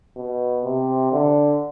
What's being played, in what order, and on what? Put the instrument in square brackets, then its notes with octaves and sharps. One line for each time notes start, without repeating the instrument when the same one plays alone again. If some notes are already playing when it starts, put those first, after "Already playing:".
[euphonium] B2
C3
D3